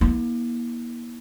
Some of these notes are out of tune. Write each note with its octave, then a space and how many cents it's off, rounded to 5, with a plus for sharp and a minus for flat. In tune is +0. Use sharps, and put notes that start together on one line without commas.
A#3 +40 E4 -35